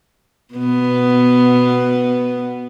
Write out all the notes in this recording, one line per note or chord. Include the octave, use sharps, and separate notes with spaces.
B2 B3